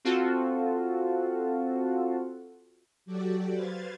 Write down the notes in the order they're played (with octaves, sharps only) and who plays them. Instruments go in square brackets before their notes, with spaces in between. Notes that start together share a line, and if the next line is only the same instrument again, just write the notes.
[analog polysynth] C4 F4 F#4 A4
[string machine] F#3 F#4 G4 A4 D5
B4 C5 F5 G#6 A6